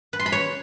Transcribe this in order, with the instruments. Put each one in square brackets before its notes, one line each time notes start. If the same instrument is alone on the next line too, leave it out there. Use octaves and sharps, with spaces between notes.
[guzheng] B4
C6
B5
C#5